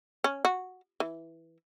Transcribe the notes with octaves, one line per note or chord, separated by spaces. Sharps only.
C#4
F#4
E3